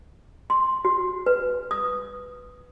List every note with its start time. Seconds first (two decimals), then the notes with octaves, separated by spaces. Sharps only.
0.50 C6
0.85 F#4
1.26 B4
1.71 D#6